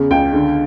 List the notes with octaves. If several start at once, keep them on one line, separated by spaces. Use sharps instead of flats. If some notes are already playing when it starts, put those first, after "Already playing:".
Already playing: E2 C#3
C#2 G5
D3